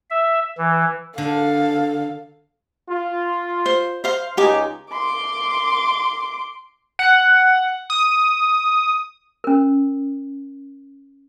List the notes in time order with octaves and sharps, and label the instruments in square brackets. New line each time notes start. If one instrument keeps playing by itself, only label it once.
[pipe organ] E5
E3
[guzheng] D3 [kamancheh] A4 F5
[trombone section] F4
[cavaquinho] C5
C5 F5 C6
[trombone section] C#2 D#4 [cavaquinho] G4 G#5 D6
[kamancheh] C6 D6
[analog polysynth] F#5
D#6
[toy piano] C#4 A#4